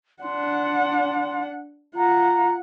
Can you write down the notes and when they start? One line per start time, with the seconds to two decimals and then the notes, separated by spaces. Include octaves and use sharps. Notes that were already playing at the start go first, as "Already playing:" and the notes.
0.23 D4 F#5 C6
1.96 F4 F#5 A#5